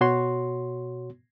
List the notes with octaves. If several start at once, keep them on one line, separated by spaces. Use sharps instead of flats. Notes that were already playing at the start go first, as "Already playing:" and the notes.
B2 F#4 C#5 C6